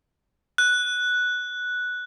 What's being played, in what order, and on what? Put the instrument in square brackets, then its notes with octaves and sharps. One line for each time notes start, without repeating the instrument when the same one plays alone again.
[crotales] F#6